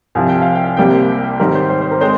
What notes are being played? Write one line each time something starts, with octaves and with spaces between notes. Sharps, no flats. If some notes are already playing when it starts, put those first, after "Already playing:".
C2 C3 F3 G#5
G5
F5
G5
C2 C3 G3 A#3 G5
G#2 D#3 G3 C4 A#4
C5
C5
C5
A#4
G#3 C4 C5